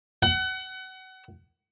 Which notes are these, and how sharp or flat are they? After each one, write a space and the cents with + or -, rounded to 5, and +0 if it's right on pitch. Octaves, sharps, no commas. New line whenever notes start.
F#5 +30